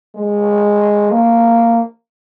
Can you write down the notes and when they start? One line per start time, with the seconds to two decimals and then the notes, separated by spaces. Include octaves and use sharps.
0.15 G#3
1.11 A#3